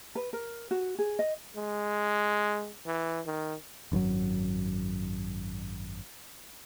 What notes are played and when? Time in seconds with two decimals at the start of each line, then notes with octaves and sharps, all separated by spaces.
0.15 B4
0.33 A#4
0.71 F#4
0.99 G#4
1.19 D#5
1.56 G#3
2.86 E3
3.27 D#3
3.92 G#1 F#2 D#3 F#3